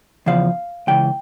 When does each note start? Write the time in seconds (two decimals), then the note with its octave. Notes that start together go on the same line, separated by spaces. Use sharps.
0.26 E2 C#3 F3 F5
0.87 C#2 C#3 E3 G5